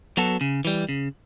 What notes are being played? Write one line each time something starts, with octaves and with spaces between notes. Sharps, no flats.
F#3 B3 F#4 A4
C#3
E3 G3
C#3